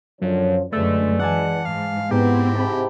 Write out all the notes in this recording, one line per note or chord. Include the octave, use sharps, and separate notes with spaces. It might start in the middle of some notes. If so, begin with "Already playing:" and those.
F#2 D3 F3 C#5
F#2 D3 G#3 A3 B4 D5 E6 A6
E3 F#5 G#5 A5 D6
G#2 F5
G#2 B3 C4 E4 G4
G#2 C3 A5 B5